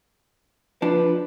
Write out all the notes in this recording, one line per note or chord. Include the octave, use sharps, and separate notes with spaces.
F3 D4 B4